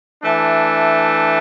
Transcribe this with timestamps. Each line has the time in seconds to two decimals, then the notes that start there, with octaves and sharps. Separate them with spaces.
0.23 E3 A3 D4